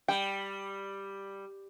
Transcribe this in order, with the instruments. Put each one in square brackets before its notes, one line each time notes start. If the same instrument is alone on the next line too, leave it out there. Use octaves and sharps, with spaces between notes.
[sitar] G3 [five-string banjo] G5